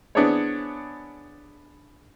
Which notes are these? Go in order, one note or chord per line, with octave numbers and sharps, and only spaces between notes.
B3 D4 E4 G#4 C5 C#5